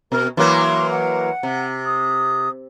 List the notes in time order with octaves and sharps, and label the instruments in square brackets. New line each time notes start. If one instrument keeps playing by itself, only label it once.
[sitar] B2 [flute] A#4
[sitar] E3 F#3 A#3 [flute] C6
[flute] F#5
[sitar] C3
[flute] D#6